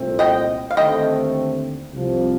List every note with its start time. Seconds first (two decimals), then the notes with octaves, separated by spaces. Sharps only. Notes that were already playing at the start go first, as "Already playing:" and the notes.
Already playing: C2 A#2 A3 C4
0.19 D#5 G5
0.71 F5
0.76 D#2 D3 A3 C4 D#5 G5
1.92 C2 C3 F3